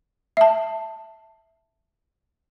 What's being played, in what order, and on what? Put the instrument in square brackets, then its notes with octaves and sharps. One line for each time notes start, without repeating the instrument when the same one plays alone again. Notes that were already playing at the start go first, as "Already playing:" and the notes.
[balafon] E5 A5